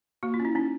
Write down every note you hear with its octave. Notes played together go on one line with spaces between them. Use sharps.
A#3 F#4
F4
C#4
E4
C#4 D#4